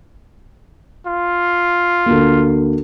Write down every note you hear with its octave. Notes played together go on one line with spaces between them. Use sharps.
F4
D2 A#3